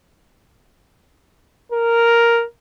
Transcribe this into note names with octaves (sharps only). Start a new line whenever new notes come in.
A#4